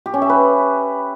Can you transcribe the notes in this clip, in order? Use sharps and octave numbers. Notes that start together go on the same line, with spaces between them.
G4
C#4
E5
B4